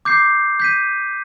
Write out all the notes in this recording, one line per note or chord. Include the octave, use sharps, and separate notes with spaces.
D6 G6 C7
G6 B6 D#7